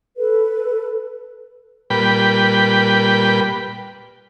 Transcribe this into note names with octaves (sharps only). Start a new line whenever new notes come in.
A4 B4
A#2 G3 B4 G5 B5